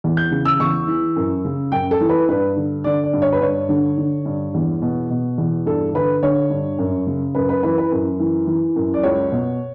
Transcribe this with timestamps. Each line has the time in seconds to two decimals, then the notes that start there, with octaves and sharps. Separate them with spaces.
0.04 E2
0.17 G6
0.31 C#3
0.45 E6
0.60 E2 C#6
0.88 E3
1.16 F#2
1.44 C#3
1.72 F#2 G5
1.91 A4
2.01 E3
2.09 B4
2.28 G2 B4
2.56 D3
2.84 D3 D5
3.04 D5
3.13 G2
3.22 C#5
3.32 B4
3.41 G2 C#5
3.69 D3
3.98 D3
4.26 G2
4.54 E2
4.82 B2
5.10 B2
5.38 E2
5.66 G2 A4
5.94 D3 B4
6.23 D3 C#5
6.50 G2
6.79 F#2
7.07 C#3
7.35 F#2 B4
7.49 B4
7.63 E3 B4
7.78 B4
7.92 F#2
8.20 E3
8.47 E3
8.76 F#2
8.94 D5
9.03 C#2 C#5
9.32 B2